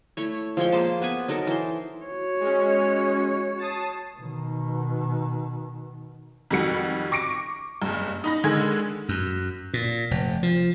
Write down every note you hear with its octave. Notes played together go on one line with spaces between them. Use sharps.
A3 E4 C#5
F3 G#3 C#5 G5
A#3 G#4 C5 A5
B3 B4 G#5
F#3 D#4 A4 A#4
E3 C5
F#4 C#5
G#3 C#4
A5 D#6 C7
B2 D#3
F2 D#3 G3 F#4 C#7
C#6 D6 A#6 C#7 D7
F#1 G2
D#4 B5 A#6
D3 D#3 G#3 G#6
F#2
A#2
F1
F3